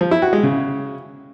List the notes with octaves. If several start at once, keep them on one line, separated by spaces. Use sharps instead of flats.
F3
E4
F#4
G#3
C#3